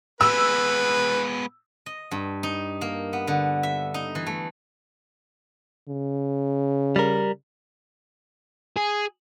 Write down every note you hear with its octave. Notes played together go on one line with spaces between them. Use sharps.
G#3 B3 B4 E6
D#5
G2
D#4
A#3
B3
D3
E5
D#4
E3
A3
C#3
G3 A#4
G#4